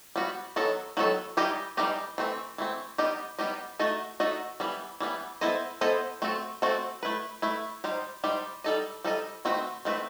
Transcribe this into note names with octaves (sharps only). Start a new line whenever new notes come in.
G3 B3 F#4
D#3 F#3 B3 F#4 A4
D#3 F#3 B3 F#4 A4
E3 G3 D#4 G4 D#5
E3 G3 D#4 G4 D#5
E3 A3 C4
E3 A3 C4
G3 B3 D#4 G4 D#5
G3 B3 D#4 G4 D#5
A3 D#4 F#4 A4 D#5
A3 D#4 F#4 A4 D#5
E3 G3 B3
E3 G3 B3
B3 E4 A4 C5 D#5
B3 E4 A4 C5 D#5
A3 C4 F#4 A4
A3 C4 F#4 A4
A3 E4 B4
A3 E4 B4
G3 D#4 G4 C5
G3 D#4 G4 C5
G3 D#4 A4 D#5
G3 D#4 A4 D#5
D#3 A3 C4 F#4 B4
D#3 A3 C4 F#4 B4